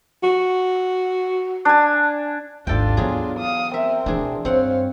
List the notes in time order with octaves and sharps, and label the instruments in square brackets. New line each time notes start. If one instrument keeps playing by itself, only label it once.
[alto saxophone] F#4
[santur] D4 G#5
[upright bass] G#1 D#2 [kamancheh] D4 F4 [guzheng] A4 G5
[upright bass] E3 B3 [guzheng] F#3 G#4
[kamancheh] F5 D#6
[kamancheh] C4 A#4 [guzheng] E5
[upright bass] B2 E3 [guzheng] D4 G#4
[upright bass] G2 [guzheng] C4 F#5 [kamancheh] C#5 F5